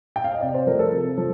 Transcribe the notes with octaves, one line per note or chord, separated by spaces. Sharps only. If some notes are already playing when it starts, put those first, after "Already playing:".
G5
F5
D#5
C3 D5
C5
F3 A3 A#4
A4
C3
F3